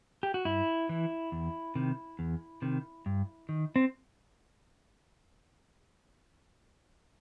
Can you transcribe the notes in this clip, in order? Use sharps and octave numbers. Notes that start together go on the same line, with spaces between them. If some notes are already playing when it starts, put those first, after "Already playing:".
G4
F#4
G2 E4
E3
E2
C3 D#3
E2
C3 D#3
G2
D#3
C4